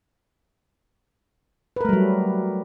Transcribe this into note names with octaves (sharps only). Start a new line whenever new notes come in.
F#3 G3 A3 A#4 B4